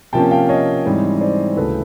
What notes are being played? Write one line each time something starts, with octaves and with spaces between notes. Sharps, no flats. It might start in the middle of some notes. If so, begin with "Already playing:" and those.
C3 F3 A#3 C#4 G5 A5
F5 G5
C#5 D#5
G#2 E3 G3 C4 D#4
C5 D5
D2 C#3 E3 A4 B4